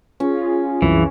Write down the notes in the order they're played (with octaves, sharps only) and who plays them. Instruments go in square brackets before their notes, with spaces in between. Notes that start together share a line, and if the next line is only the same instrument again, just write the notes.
[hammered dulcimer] C#4 [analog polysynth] F4 G#4
[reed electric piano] C2 F#2 C3 [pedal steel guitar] E3